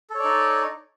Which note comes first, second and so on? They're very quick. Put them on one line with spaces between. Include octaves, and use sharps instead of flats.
A4 C#5 D5 D#4